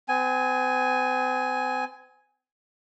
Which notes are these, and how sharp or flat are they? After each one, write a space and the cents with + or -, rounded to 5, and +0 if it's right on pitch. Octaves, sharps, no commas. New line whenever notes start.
C4 -45 G#5 +0